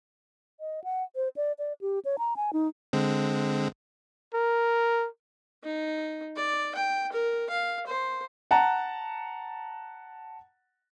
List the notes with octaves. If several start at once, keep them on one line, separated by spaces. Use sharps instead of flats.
D#5
F#5
C5
D5
D5
G4
C#5
A#5
G#5
D#4
D3 G#3 C4
A#4
D#4
D5
G5
A#4
F5
C5
F#5 A5 A#5